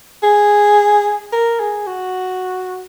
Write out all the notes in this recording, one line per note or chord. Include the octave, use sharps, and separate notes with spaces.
G#4
A#4
G#4
F#4